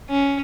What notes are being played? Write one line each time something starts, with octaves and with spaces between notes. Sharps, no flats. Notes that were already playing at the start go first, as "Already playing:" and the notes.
C#4